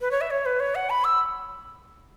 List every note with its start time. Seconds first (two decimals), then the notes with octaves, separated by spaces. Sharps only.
0.01 B4
0.11 C#5
0.21 E5
0.30 C#5
0.46 B4
0.60 C#5
0.75 F#5
0.90 B5
1.04 E6